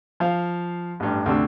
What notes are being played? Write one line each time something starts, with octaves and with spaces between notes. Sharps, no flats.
F3 F5
A1 G2
D2 C3 D4 E6